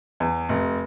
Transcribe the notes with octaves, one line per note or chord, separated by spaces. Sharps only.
E2
F1